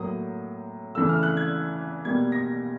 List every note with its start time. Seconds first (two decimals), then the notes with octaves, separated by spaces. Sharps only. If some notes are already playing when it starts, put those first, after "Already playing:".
Already playing: A2 F#3 A#3 D#6
0.95 C#3 E3 A3 E6
1.09 F6
1.23 F#6
1.37 G#6
2.05 B2 G3 A#3 G#6
2.32 A#6